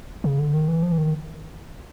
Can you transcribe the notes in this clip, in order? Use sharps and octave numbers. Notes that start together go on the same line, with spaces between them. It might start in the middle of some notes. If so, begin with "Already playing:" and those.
C#3
D3
D#3
E3
F3
E3
D#3